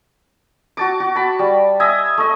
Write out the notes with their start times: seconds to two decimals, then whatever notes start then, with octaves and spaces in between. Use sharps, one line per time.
0.77 F#4 A5 D6
1.00 F#4
1.15 A5 B5
1.39 G3
1.80 D#5 E5 G#5 D#6
2.18 A3 D#5